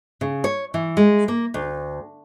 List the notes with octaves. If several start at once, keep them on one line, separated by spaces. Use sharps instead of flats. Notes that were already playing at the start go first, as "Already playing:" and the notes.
C#3
C#5
E3
G#3
A#3
D2